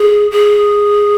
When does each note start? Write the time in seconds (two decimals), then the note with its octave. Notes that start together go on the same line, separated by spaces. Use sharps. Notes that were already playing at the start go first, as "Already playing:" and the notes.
Already playing: G#4
0.31 G#4